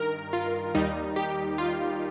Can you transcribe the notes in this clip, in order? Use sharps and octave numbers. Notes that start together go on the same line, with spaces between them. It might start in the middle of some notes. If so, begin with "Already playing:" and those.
Already playing: G2 D#3 A#4
F4
D#2 D#3 G3 D#4
G4
F4